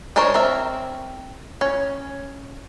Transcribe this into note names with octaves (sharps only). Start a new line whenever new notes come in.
G#3 D4 A#4 C5 C#5
C4 A#4 E5
C#4